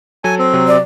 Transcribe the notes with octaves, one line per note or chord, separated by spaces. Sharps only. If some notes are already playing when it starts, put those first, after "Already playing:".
F#3 A4 G#5
C4
C3 F#3
D5